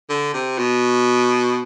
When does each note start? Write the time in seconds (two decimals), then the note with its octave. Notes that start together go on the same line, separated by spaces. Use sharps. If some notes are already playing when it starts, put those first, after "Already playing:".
0.09 D3
0.34 C3
0.58 B2